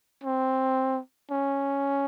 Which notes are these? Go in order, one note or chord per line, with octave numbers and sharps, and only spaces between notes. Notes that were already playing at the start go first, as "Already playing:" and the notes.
C4
C#4